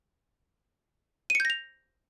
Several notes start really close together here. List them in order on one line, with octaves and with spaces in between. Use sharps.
D#7 C#7 G6 A#6 F7